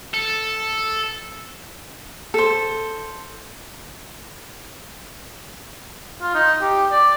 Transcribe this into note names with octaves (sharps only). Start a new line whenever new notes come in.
A4
A4 C5
F4
D#4
G4
D5